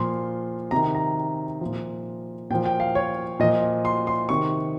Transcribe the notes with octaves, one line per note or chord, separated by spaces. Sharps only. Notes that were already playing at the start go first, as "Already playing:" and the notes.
Already playing: A#2 F3 C6
C3 D#3 A#5
A#5
A#2 F3
A#2 F3 G5
G5
F5
C#5
A#2 F3 D#5
C6
C6
C3 D#3 C#6